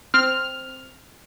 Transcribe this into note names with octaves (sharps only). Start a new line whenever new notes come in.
C4 F6